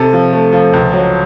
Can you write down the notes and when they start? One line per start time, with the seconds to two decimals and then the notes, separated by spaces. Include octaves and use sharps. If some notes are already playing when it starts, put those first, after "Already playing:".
Already playing: C3 A4
0.13 F3
0.33 A3
0.53 F3
0.73 C#2
0.93 F#3